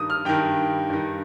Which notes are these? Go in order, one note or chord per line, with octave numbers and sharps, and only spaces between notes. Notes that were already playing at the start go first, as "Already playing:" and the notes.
Already playing: G2 D#3 D#6
F6
G2 D#3 G5
G2 D#3